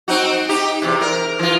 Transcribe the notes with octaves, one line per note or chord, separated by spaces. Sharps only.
C4 D#4 F#4
D#4 G4
E2 C3
A#4
E3 F4